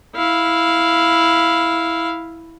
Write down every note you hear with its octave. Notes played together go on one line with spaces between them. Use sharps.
E4 F5